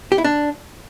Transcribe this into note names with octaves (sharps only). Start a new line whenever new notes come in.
G4
E4
D4